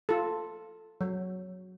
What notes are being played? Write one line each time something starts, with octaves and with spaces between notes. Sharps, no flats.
F4 A4
F#3